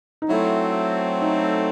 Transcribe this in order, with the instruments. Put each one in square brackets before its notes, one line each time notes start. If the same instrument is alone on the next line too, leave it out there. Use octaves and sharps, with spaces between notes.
[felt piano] D#4
[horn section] F#3 A3 C4 [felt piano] E4
[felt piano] D#4